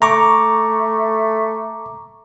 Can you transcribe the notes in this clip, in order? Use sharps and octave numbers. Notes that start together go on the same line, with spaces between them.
A3 A#5 C#6 D6